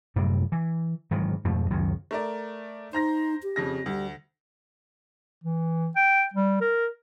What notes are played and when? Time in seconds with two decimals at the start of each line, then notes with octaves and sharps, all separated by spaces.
0.16 F#2 A2 C3 G3
0.52 E3
1.11 G#2 D#3 E3 F#3
1.45 F2 G#2 B2 A3
1.71 C#2 F#2 D#3 F#3
2.11 A3 A#4 D5
2.93 D#4 C5 A#5 A#6
3.43 G4
3.56 F2 C#3 A#6
3.86 D2 G3
5.44 E3
5.96 G5
6.34 G3
6.61 A#4